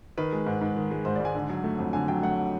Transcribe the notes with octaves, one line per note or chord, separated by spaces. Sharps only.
D#3 B4
G#3
G#2
G#2
D#3
G#3
G#2 C5
D5
G#2 G#5
D3
F#3
A3
F2
D3 G#5
F#3 G5
A3 F#5